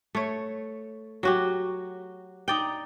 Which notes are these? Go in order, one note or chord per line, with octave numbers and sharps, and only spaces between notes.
A3 C#5
F#3 F#4 G4
D#4 D5 G5